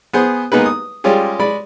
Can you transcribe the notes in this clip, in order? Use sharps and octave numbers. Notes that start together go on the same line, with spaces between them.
B3 G#4 C5
G#3 A#3 B3 D#4 G#4 B4
D#6
G3 G#3 C#4 F4 G4 G#4
G#3 D5 B5